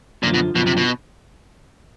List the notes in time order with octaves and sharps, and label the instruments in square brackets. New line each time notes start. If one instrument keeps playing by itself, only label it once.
[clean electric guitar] F#2 D3 F3 [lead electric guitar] A#2
[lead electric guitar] B2
[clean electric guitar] F#2 D3 F3 [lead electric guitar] B2
[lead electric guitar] C3
B2